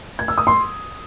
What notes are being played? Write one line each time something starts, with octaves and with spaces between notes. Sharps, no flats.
G#6
E6
D#6
C6